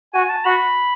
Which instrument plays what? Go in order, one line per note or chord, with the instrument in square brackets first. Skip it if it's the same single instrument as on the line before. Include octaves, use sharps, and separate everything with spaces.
[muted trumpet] F#4 [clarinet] G#5
[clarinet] A5
[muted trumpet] F#4 [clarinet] B5